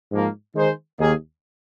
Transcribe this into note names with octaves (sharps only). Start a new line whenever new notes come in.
G#2 F3 A#3
D#3 G#3 D#4 G#4 C5
D#2 D#3 A#3 G#4